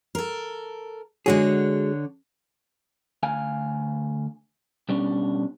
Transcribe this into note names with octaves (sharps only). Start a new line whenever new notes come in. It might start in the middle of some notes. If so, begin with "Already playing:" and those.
A4 A#4
D3 G#3 D4 F#4 G#4 C#5
D2 F5 G#5
B2 G3 C#4 D4